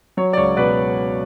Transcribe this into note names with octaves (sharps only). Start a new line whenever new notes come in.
F#3 C#5
D5
C#2 C#5
B2 B4 D5